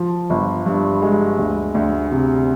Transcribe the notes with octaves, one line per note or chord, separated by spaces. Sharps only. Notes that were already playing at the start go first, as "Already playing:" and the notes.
Already playing: F3
G1
G2
G#3
D2
D2
C3